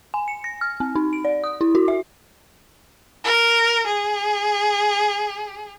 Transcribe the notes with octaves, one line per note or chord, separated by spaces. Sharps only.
G#5
C#7
A#6
F6
C4
D#4
D7
D5
D#6
E4
F#4
E5
A#4
G#4